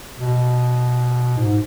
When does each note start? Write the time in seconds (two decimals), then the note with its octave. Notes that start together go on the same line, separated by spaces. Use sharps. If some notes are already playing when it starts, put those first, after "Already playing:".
0.18 B2
1.37 G#2